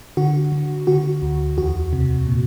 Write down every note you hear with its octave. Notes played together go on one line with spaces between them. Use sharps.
D3 F#4
D3
D3 F#4
D2
E2 F#4
C3
A#2